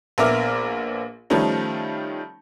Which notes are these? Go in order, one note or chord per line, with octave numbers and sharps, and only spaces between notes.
A#1 B3 A#4 E5 D6 F6
D#3 F3 G3 A3 C#4 D#4